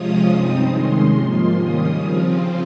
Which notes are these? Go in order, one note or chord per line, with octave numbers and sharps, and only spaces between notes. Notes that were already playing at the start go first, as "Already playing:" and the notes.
Already playing: C3 F3 G#3 C#4 F4 D#6
G2 G3 C4 D#4
C3 D#3 G#3 C#4 C6
G#2 F3 A#3 F4
D#3 G3 C#4 D#6
C#3 F3 C4 F4